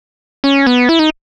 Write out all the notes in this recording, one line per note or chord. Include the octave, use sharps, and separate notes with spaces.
C#4
B3
E4
D#4